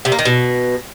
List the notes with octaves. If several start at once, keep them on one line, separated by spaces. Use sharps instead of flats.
C3
A#3
D#3
B2